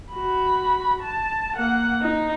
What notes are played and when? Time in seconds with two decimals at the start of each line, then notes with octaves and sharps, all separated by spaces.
0.12 F#4 B5
1.03 A5
1.56 A#3 F#5
2.01 D#4